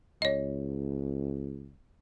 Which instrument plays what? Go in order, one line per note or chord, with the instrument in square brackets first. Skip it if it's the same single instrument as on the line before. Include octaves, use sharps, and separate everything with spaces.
[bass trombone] C#2 [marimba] C#5 D#5